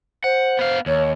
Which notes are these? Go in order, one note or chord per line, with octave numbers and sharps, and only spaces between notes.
C5 F#5
B3 F5
D#2 C#5